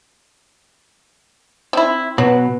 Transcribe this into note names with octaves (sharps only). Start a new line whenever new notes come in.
C4 E4
B2 F#3 B4